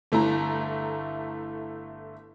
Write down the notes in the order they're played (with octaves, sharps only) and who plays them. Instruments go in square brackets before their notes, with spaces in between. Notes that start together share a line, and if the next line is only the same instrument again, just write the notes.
[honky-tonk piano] G1 A3 E4 A#5